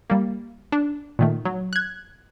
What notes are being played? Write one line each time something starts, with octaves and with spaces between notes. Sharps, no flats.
G3 A#3
D4
A#2 D#3 A3
F#3
F#6 G#6